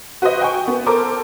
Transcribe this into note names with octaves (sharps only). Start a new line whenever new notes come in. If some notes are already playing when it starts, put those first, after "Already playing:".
F#4 B4 C5 D#5
G5 G#5 C#6
B3
A4 A#4 C5 D6